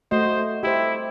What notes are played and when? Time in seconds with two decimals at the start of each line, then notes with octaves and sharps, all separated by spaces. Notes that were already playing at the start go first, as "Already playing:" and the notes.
0.11 A3 F#4 C5 D#5
0.63 E4 G4 C5